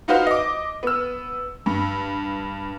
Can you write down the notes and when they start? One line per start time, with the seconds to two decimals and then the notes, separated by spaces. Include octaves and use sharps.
0.08 D#4 F4 F#4 B4 C5 F5
0.27 D#5 D6
0.83 B3 E6
1.66 G2